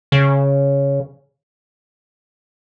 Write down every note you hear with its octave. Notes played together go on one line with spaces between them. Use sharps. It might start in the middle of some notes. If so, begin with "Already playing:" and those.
C#3